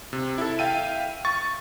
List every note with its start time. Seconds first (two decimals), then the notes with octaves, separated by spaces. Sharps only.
0.13 C3
0.38 E4 A4
0.59 E5 F5 G5 D#7
1.25 C#6 A6